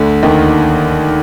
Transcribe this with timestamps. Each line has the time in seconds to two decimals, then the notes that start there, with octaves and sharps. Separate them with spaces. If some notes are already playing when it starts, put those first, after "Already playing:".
Already playing: D2 D3
0.23 D#2 D#3